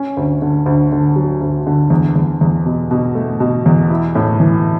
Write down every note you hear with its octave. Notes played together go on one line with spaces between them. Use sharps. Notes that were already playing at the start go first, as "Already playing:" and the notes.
Already playing: C#4
D2
D3
D2
D3
F#3
D2
D3
E2
E2
E2
B2
B2
A3
B2
E2
E4
A2
E3